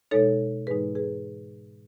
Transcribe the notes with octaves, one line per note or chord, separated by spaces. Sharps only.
B2 G#3 D#4 A4 C#5
G#2 E3 G#3 D#4 G#4 B4
G#4 B4